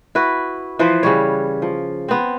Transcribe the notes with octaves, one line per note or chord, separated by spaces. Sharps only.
E4 F#4 B4
E3 F3 B4 C5
C#3 G3 C#5
F3
B3 C4